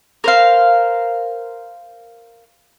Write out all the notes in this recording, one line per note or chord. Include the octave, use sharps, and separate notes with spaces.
A#4 C5 F5